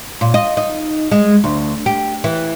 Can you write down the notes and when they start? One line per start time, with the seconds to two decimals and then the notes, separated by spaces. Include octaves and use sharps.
0.21 A#2
0.34 D#5
0.57 D#4
1.12 G#3
1.44 D2
1.86 G4
2.24 E3